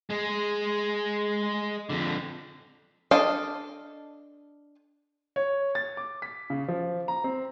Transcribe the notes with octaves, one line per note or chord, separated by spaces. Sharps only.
G#3 G#4
F2 D3
D4 A4 D#5 F5
C#5
A6
D6
B6
C#3
F3
A#5
C4